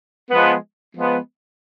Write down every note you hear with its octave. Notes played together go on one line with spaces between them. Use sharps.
F3 G#3 B3
F3 G#3 B3